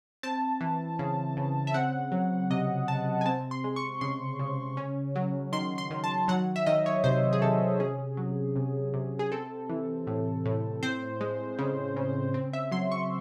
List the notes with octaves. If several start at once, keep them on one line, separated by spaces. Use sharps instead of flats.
C4 A5
E3
C#3
C#3
E5
C4 F#5
F#3
C3 D#5
C3 A5
G#5
C4 A5
C6
G#3
C#6
C#3 C6
C#3
C#4
F#3
D#3 C6
C6
D#3
A5
F#3 F#5
E5
D#3 D#5
C#5
C3 C5
G#4
C3 A4
C#4 G#4
F#3
C3
C3
G#4
C4 A4
E3
A2
A2
C4 C5
G#3
C#3
C#3
C4
E5
F#3 C6
C#6